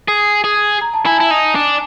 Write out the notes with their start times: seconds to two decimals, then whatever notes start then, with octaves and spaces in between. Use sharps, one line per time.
0.08 G#4
0.44 G#4
0.81 A#5
0.94 A5
1.06 E4 G#5
1.18 E4 A5
1.31 D#4
1.55 D4